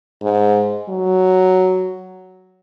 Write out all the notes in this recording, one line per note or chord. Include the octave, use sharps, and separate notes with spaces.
G#2
F#3